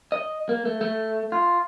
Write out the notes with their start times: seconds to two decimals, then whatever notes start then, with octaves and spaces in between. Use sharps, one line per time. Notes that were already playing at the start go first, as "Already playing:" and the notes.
0.12 D#5
0.49 A#3
0.65 A3
0.81 A3
1.32 F4